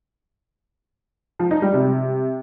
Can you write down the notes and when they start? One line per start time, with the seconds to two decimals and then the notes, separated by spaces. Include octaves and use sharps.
1.39 F3
1.51 D#4
1.62 G3
1.73 C3